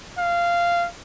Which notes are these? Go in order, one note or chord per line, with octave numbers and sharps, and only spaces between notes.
F5